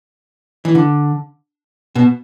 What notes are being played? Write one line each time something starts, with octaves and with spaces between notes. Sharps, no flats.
E3
D3
B2